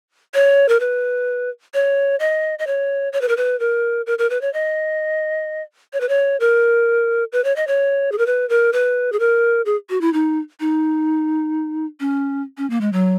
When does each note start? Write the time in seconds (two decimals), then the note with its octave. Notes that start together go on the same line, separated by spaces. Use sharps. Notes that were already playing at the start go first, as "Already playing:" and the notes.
0.34 C#5
0.69 A#4
0.80 B4
1.74 C#5
2.20 D#5
2.59 D#5
2.67 C#5
3.13 C#5
3.21 B4
3.29 A#4
3.37 B4
3.60 A#4
4.07 A#4
4.18 A#4
4.30 B4
4.41 C#5
4.53 D#5
5.93 C#5
6.00 B4
6.09 C#5
6.40 A#4
7.32 B4
7.44 C#5
7.56 D#5
7.67 C#5
8.12 G#4
8.18 A#4
8.26 B4
8.49 A#4
8.73 B4
9.12 G#4
9.20 A#4
9.66 G#4
9.90 F#4
10.01 E4
10.13 D#4
10.60 D#4
12.00 C#4
12.58 C#4
12.70 A#3
12.81 G#3
12.93 F#3